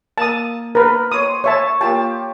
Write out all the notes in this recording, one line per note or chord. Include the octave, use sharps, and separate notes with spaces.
A#3 A5 D#6
A#4 B4
C5 C#5 C6 D#6
C#5 E5 A5 C#6
A#3 F4 G4 A5